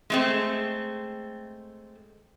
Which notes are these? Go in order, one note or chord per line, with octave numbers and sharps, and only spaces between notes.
G#3 A3 C4